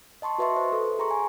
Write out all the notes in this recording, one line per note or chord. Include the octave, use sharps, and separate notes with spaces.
D#5 A5 C6 C#6
F#4 B4 D#5 E5 C6 C#6
C5
A4
G#4 A#5 C6 C#6
G#5